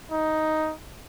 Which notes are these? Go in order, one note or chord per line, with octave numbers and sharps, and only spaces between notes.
D#4